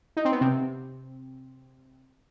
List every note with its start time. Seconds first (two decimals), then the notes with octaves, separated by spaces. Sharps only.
0.17 D#4
0.25 C4
0.32 B3
0.41 C3 C4